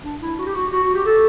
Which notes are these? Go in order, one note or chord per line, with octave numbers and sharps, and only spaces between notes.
D4
E4
F#4
G4
F#4
F#4
F#4
G4
A4